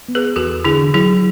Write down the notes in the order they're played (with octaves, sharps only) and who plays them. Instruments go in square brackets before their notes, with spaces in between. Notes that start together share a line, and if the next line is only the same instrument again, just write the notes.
[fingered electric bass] B3
[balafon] G#4 B4
[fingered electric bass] E2 [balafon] F#4 A4
[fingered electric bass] D3 [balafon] E4 G#4
[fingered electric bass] F#3 [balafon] E4 G#4